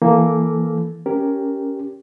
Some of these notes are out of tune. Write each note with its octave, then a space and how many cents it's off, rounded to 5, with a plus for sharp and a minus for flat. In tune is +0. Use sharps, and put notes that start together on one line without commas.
E3 +0 A#3 +0 A4 -20
C#4 +10 G4 +0 A#4 +0